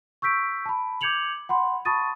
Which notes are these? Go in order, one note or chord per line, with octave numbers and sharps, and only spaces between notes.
C#6 E6 G6 B6 D7
A5 B5
D6 G6 G#6 C#7 F7 F#7
F#5 B5 C6
A5 B5 C#6 D#6 A6 D#7